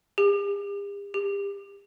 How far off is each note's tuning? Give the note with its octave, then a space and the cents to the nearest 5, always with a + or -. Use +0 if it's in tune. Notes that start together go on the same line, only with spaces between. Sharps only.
G4 +45
G4 +35